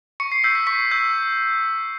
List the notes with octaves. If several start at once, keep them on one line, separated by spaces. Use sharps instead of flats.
C#6 C#7
C7
E6 G6 B6
B6
C#6 B6
E6 G6